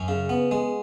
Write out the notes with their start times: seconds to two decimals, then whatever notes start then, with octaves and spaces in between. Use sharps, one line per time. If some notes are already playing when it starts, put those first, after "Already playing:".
Already playing: F#2 C#4
0.08 C#3
0.29 B3
0.51 G#3